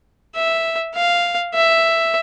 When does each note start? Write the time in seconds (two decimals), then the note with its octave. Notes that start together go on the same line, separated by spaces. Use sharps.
0.35 E5
0.95 F5
1.54 E5